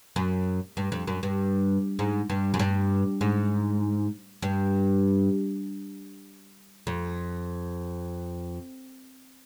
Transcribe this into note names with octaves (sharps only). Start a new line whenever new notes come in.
F#2
G2
F2
F#2
G2
G#2
G2
F#2
G2
G#2
G2
F2